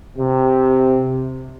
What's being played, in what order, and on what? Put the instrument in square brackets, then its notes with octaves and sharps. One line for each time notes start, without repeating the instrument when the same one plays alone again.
[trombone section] C3